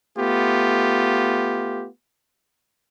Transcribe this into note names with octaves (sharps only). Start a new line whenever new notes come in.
A3 B3 F4 G4